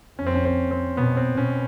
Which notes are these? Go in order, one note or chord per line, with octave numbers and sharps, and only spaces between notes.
F2 C#4
C4
C#4
C4
C4
B2 B3
C4
B2 C#4